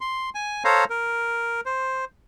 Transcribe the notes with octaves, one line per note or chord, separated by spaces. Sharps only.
C6
G#5
A4 C5 C#5 F5 A#5
A#4
C5